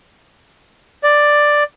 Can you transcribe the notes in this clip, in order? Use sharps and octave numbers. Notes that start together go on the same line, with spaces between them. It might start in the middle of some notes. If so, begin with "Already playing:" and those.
D5